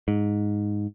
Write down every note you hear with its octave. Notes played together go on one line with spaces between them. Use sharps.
G#2